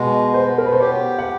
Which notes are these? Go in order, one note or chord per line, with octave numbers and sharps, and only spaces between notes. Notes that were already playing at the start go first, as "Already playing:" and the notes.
Already playing: B2 G#3
B3 C5
A#4
B4
C5
G4 C#5
F#5